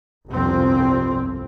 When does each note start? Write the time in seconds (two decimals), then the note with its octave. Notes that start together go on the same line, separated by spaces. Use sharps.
0.29 G1 C2 F2 C4